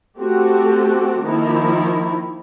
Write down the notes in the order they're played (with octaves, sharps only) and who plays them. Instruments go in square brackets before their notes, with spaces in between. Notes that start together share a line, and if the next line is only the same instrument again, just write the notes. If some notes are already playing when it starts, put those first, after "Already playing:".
[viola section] A3 C4 F#4 G4 A4
D#3 F3 A#3 D#4 E4